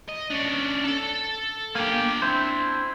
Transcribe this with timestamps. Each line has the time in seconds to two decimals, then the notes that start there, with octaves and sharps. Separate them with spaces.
0.08 D#5
0.30 C#4 D4
0.84 A4 A5
1.75 A#3 D4 G4 G#5
2.22 C4 E4 C5